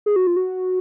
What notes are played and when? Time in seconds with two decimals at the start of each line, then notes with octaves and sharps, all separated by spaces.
0.06 G#4
0.16 F#4
0.27 F4
0.36 F#4